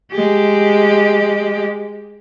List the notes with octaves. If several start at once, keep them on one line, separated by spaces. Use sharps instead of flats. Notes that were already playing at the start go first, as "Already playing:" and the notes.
G#3 G4